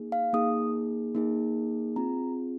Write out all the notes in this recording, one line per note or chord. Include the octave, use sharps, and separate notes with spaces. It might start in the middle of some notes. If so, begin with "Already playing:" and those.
Already playing: A#3 D#4 G#4
F5
A#3 D#4 G#4 D#6
A#3 D#4 G#4
C4 F4 G#4 A#5